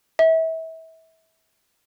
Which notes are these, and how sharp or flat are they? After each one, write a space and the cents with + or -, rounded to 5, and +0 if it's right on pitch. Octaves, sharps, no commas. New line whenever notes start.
E5 -30